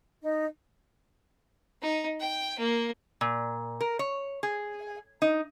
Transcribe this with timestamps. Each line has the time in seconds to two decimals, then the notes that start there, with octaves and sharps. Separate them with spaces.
0.22 D#4
1.82 D#4
2.20 G5
2.59 A#3
3.21 A#2
3.81 A#4
3.99 C#5
4.43 G#4
5.22 D#4